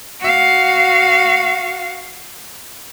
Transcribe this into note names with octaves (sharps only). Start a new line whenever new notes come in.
F#4 F5